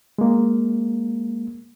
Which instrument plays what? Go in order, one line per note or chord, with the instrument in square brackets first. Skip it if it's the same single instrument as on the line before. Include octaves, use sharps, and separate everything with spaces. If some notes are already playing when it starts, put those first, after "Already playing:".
[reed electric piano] G#3 A#3